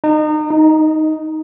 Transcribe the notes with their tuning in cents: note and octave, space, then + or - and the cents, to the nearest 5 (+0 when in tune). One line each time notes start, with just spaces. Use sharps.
D#4 -30
D#4 +5